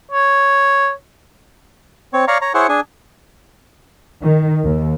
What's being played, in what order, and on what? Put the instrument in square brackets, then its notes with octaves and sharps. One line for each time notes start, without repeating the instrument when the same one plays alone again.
[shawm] C#5
[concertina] C4 C#5
C#5 D5 F5 A#5 C#6
C#5 A#5
E4 G#4 C5 C#5 F#5 C#6
D4 G#4 G#5
[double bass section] D#3
D#2